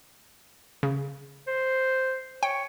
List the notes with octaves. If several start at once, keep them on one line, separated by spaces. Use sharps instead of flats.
C#3
C5
C#5 G5